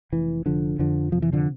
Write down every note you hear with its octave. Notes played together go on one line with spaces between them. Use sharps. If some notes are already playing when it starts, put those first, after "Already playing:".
F1 E3
F1 D3 F3
F2 D3 F3
C3 F3
E3
D3 F3